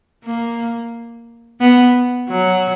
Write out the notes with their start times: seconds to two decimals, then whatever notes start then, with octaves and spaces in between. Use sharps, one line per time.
0.25 A#3
1.61 B3
2.30 F#3